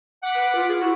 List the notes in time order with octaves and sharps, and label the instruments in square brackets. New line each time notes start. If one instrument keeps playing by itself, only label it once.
[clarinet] F#5 [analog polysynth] D6 F#6 B6
[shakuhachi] B4
F4
[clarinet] G#4
[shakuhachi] E4 [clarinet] F#4